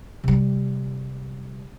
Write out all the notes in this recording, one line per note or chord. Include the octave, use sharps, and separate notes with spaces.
C3 G3